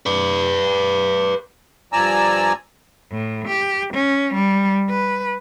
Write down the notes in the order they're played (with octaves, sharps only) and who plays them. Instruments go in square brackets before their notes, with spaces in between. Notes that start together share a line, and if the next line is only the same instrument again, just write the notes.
[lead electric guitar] B4 D5
[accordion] G2 F3 D5 G#5 A#5 E6
[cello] A2
G4
C#4
G3
B4